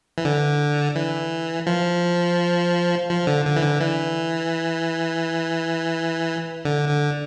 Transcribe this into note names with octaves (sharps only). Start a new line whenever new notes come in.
E3
D3
E3
F3
F3
D3
D3
E3
D3
E3
D3
D3